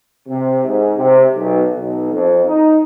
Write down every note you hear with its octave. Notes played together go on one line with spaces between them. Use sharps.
C3
G#2
C3
B1
B1
F2
D#4